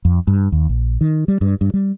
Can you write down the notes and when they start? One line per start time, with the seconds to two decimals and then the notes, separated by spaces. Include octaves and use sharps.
0.05 F2
0.27 G2
0.52 D#2
0.69 A#1
1.01 D#3
1.28 G3
1.41 G2
1.61 G2
1.74 G3